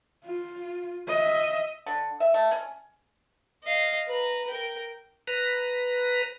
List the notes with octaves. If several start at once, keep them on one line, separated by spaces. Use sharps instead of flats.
F4
D#5 E5
D3
E5
A3
C#4
D#5 F5
B4 A#5
A#4 G5
B4 A#5